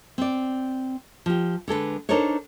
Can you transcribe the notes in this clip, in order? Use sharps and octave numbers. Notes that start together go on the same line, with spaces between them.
C4 D5
F3 G4
D3 G#3 A4 B4
D4 D#4 A4 A#4 C5 C#5